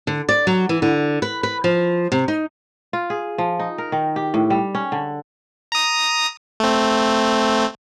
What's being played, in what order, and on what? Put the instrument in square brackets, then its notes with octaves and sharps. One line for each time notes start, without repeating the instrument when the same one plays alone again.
[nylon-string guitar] D3
D5
F#3
E3
D3
B4
B4
F3
C3
D#4
[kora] F4
G#4
F3
D#4
A#4
D#3
G4
A2
G3
C#4
D3
[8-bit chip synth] A#5 D#6
A3 C4